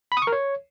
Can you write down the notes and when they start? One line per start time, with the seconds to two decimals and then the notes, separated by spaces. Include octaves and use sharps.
0.12 B5
0.17 D#6
0.22 C#6
0.27 A#4
0.32 C#5